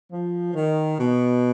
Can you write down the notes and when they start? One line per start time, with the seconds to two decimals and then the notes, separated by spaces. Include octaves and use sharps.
0.11 F3
0.54 D#3
0.99 B2